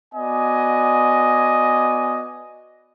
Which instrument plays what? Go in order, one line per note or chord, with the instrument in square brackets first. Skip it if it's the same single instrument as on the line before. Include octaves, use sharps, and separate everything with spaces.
[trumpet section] B3 F#4 D5 D#5 G#5